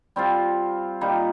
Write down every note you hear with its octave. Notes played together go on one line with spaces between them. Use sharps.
G3 C4 F4
A#2 G3 A#3 D#4